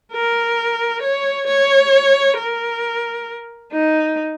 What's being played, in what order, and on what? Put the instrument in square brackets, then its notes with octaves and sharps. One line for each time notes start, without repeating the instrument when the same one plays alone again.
[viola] A#4
C#5
C#5
A#4
D#4